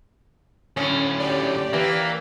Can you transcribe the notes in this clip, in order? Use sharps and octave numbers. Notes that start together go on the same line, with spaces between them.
D2 A2 C#4
G4 D5
E3 A#3